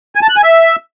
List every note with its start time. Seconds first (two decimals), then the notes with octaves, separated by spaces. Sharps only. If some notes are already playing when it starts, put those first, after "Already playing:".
0.15 G#5
0.22 A5
0.29 F#6
0.36 G#5
0.43 E5